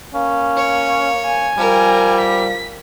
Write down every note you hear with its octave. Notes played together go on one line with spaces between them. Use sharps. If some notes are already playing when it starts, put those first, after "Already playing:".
A#3 C#4
C#5
G#5
F3 G3 A#4
B6